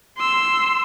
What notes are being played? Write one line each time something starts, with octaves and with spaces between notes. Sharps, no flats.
C6 E6